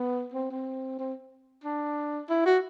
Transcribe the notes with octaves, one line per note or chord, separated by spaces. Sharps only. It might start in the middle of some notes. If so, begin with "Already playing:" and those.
Already playing: B3
C4
C4
C4
D4
E4
F#4